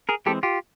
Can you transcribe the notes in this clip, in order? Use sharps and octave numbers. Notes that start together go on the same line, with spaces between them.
G#4 A#4
E3 G#3 C4 G4 A4
F4 G4